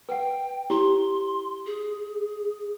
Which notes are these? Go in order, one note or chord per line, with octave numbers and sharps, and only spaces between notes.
B4 F#5 G5
E4 G4 C#5 C6
G#4